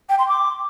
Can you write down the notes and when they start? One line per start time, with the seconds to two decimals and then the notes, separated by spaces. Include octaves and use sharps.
0.09 G5
0.19 C6
0.28 D6